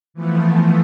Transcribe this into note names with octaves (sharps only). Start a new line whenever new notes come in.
E3 F3 A3 B3